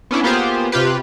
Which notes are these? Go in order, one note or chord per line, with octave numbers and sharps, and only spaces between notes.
B3 C#4 D4 E4
A#3 B3 F4 G4 G#4 C5
C3 F4 G4 B4